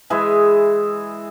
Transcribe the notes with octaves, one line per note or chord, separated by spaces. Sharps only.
E3 G#3 G#4 E5